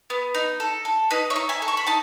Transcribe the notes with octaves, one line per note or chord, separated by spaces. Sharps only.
B3
D#4
A4
A4
D#4 B4 D#5
C#5 E5
D#4
E5 G#5
A4
C#6
B5
D#4 A5